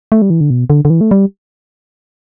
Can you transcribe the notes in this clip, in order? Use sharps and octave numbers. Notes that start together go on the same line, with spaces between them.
A3
G3
E3
D3
B2
D3
D3
E3
A3
G3